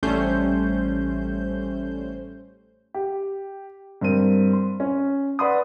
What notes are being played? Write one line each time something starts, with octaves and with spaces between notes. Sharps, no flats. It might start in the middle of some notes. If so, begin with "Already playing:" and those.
A1 G3 A3 C#4 C5 G6
G4
G2 C4 A#4 D#7
C6
C#4
B4 D5 F#5 B5 C6 D#6